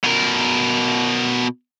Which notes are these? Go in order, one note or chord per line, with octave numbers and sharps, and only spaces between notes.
B2 A#4